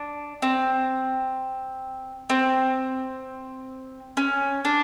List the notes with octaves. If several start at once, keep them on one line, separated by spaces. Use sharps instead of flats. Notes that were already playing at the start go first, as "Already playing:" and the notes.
Already playing: D4
C4
C4
C#4
D4